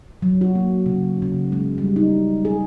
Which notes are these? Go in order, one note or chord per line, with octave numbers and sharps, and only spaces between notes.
F#3
F#4
A#3
C#3
C#3
G#3
G3
D#4
G#4